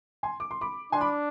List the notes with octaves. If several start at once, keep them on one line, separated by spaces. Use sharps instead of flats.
G#5 C6
D6
C6
B5 D6
D4 G#5 C6
B5 D6